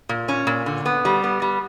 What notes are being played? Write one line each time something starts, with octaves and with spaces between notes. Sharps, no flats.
A#2
C#4
A#2
D3
B3
G3
B3
G3